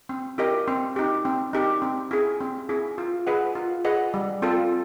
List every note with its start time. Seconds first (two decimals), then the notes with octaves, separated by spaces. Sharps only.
0.09 C4
0.38 E4 G4 A#4 D#5
0.68 C4
0.96 D#4 G4
1.25 C4
1.53 D#4 G4
1.82 C4
2.11 E4 G#4
2.41 C4
2.69 E4 G#4
2.98 F4
3.27 G#4 B4 D#5 F#5
3.55 F4
3.84 G#4 B4 D#5 F#5
4.14 G3
4.42 C4 F4 A4